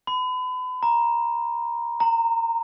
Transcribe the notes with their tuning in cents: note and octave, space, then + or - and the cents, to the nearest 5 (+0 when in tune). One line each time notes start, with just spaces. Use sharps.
B5 +35
A#5 +10
A#5 -20